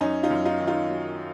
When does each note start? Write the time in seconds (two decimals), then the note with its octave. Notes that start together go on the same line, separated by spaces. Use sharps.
0.01 F#2 C#4 D#4
0.23 D#4 F4
0.30 F#2
0.45 D#4 F4
0.60 D#3
0.67 D#4 F4
0.89 F#3